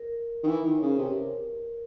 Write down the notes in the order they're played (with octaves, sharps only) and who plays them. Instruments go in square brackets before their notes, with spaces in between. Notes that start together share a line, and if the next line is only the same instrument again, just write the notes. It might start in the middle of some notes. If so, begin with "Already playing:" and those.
Already playing: [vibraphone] A#4
[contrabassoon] D#3
E3
D#3
[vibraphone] C#5
[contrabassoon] C#3
[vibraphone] C5
[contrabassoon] C3 [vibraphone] B4
[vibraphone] A#4